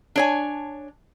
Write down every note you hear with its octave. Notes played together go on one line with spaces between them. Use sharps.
D4 C#5 G#5